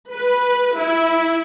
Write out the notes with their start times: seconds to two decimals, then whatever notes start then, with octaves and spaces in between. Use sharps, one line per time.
0.14 B4
0.77 E4